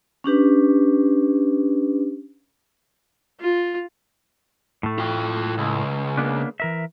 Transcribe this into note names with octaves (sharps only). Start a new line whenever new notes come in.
C#4 D4 G4 B4
F4
A2 A3
F4 G5
C#2
A#3 B3 D4
E3 A#4 E5